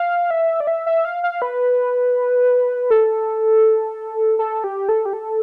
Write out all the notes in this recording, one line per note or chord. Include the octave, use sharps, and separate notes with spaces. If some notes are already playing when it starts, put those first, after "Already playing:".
Already playing: F5
E5
D5
E5
E5
F5
F5
B4
A4
A4
G4
A4
G4
A4